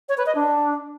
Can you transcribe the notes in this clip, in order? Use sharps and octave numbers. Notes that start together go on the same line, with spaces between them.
C#5
B4
D#5
D4